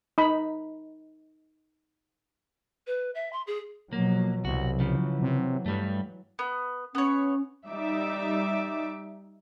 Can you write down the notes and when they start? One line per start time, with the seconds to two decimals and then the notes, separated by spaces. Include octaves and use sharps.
0.18 D#4 B5
2.87 B4
3.15 E5
3.33 C6
3.47 G#4
3.93 B2 F3 F#3 A#3
4.45 C2 E3 F#3 F#4
4.80 C#3 F3
5.21 C3
5.66 G2 G3 A3
6.39 B3
6.95 B3 C#4 C#5
7.69 G3 D#4 E5 D6